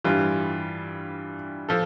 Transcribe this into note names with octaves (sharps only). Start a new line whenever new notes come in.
G2 E3 G3 F4
F3 A4